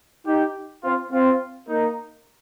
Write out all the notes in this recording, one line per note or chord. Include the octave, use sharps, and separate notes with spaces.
D#4 G4
C4 F4
C4 F4
A#3 D#4